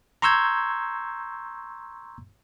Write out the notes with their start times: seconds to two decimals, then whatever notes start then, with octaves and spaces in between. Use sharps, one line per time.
0.22 A#5 C6 C#6 E6 G6 G#6